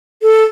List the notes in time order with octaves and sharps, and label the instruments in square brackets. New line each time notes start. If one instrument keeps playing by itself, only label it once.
[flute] A4